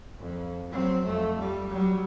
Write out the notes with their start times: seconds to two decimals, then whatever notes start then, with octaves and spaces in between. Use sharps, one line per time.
0.20 F2
0.70 F#3 C4
1.04 F2 A3
1.38 G3
1.69 F#3 G3